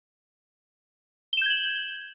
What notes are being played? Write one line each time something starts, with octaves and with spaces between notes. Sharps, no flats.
G6 G#6 E7 F#7 G7